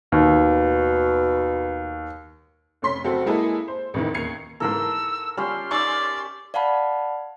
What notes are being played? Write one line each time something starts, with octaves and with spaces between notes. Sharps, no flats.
D#2 B2
F1 C#4 C6 B6
F#1 C4 F#4 A4
G#3 A#3 E4 G#4 A4
C5
A1 E2 D#3
D#2 G#6 C7 C#7 F7
G#2 E3 A#3 A4 A#4 C6 E6
G3 C#4 F4 G4 C6
C#4 D#4 D5 E5 C#6 E6
D5 F5 F#5 A5 B5